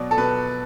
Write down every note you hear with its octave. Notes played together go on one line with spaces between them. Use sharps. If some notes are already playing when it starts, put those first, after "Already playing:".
Already playing: B2 F#3 D5
A4
B2 B4